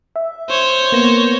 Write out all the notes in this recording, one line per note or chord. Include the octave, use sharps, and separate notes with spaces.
E5
C5 C#5
A#3 B3 A#6